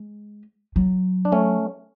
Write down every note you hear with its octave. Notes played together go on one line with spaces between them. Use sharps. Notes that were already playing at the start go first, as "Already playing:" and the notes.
Already playing: G#3
F#3
D4
A3 C#4